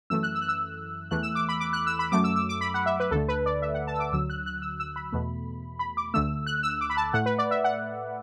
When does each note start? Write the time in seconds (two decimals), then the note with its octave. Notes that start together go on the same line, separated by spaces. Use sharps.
0.10 F#2 E3 A3 E6
0.23 F#6
0.35 E6
0.41 F#6
0.49 E6
1.11 E2 E3 A3 F#6
1.23 E6
1.35 D6
1.49 B5
1.60 D6
1.73 F#6
1.87 E6
1.99 B5
2.12 F#2 F#3 A3 D6
2.24 E6
2.36 E6
2.49 D6
2.61 B5
2.74 F#5
2.86 E5
3.00 B4
3.11 D2 D3 A3 A4
3.28 B4
3.46 D5
3.62 E5
3.74 F#5
3.87 A5
3.94 E6
4.00 D6
4.13 D2 D3 F#3 E6
4.30 F#6
4.46 F#6
4.62 E6
4.80 E6
4.96 B5
5.12 E2 B2 A3
5.79 B5
5.97 D6
6.14 D2 D3 A3 E6
6.46 F#6
6.63 E6
6.81 D6
6.90 B5
6.97 A5
7.13 A2 A3 F#5
7.26 B4
7.38 D5
7.51 E5
7.64 F#5